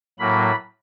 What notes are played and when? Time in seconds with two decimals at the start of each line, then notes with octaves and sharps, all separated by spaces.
0.19 A2 F#3 A#3 B5